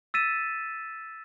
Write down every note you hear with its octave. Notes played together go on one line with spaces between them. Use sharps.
E6 A6 B6 D#7 E7